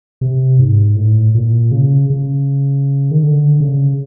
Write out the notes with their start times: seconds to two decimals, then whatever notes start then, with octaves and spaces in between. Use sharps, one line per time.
0.21 C3
0.59 G#2
0.96 A2
1.35 A#2
1.71 C#3
2.10 C#3
3.11 D#3
3.23 D3
3.60 C#3